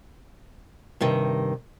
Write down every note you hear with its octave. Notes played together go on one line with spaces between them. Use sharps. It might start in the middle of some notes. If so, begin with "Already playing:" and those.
G2 C3 D#3